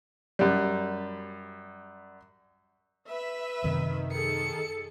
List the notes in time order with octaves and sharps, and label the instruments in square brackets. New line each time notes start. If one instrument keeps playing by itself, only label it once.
[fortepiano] F#2 G3
[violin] B4 [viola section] E5
[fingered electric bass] F#2 C3 F#3 [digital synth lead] D#3
[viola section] G#4 A4 [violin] C#7